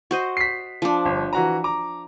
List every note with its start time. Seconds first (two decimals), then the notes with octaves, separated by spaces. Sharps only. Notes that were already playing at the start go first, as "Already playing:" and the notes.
0.11 F#4 C5 D#5
0.37 B6 C7
0.82 F3 D4
1.05 G1
1.33 E3 F#4 A#5
1.64 A#5 D6